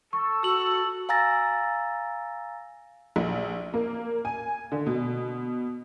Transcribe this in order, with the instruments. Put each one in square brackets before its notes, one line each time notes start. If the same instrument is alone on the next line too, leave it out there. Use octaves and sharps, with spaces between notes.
[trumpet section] A4 [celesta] C#6
[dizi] F#4 [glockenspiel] E6 F#7
[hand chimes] F5 G#5 A#5 E6 A6 A#6
[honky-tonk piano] A#1
A#3
G#5
D3
B2